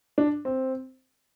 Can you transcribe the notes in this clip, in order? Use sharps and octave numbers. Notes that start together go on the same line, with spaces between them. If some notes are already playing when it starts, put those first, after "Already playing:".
D4
C4